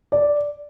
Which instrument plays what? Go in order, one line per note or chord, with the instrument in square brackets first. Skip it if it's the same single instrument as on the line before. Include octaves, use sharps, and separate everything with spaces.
[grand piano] D5